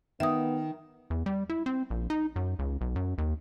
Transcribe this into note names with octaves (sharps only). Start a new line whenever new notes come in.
D#3 B3 E5 D#6
E2
G3
E4
C4
A#1
D#4
F#2
C#2
B1
F#2
D#2